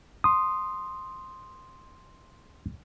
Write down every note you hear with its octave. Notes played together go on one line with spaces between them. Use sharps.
C6 D#6